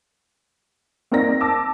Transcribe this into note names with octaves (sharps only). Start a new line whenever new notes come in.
A#3 C4 D#4 A#4 D5 A#6
A5 D6 E6